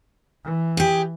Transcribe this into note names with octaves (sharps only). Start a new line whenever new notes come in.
E3
G4 G#4